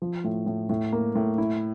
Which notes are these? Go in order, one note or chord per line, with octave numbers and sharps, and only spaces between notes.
F3
A2
A2
A2
A#3
A2
E4